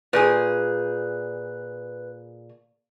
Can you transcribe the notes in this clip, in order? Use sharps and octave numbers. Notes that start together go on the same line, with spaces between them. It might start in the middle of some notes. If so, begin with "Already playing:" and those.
A#2 G#4 B4